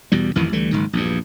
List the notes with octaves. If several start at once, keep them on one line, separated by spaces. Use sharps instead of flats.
E2 B2 G3
A1 F2 D#3 E3
D2 E3 G3 A3
F#1 G#2 D#3
A#1 E2 G2